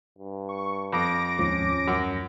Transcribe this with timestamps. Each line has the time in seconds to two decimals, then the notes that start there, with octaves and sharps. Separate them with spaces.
0.18 G2
0.49 C#6
0.93 F2 D6 A#6 D7
1.39 D#2 G#2 F3 C#4
1.88 F#2